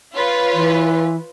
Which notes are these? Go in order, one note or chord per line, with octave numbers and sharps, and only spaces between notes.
F4 B4 C#5
E3